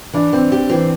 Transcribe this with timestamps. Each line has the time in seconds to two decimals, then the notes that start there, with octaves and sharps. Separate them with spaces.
0.13 E3 D4
0.33 E3 C4
0.52 G4
0.69 E3 C4